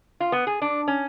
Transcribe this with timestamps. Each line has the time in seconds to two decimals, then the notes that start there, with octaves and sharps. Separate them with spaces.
0.20 F4
0.32 B3
0.47 G#4
0.62 D4
0.88 C#4